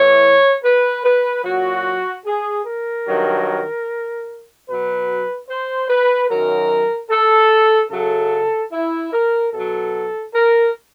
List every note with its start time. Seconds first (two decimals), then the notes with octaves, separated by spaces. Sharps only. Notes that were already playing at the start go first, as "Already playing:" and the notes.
Already playing: A2 E3 C#5
0.64 B4
1.04 B4
1.44 A#2 F#3 F#4
2.26 G#4
2.65 A#4
3.07 G2 D#3 F#3
4.68 B2 F#3 B4
5.49 C5
5.88 B4
6.29 F#2 D#3 F#3 A#4
7.10 A4
7.91 F#2 C#3 F#3 A4
8.72 E4
9.13 A#4
9.52 B2 F#3 A4
10.34 A#4